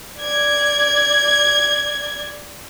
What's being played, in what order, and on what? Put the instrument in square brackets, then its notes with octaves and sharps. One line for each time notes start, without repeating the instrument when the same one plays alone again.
[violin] D5 G#6